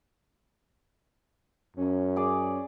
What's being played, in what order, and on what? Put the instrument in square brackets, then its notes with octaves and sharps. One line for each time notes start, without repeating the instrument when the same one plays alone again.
[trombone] F#2 [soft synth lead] C#4
[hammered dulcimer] G#4 D5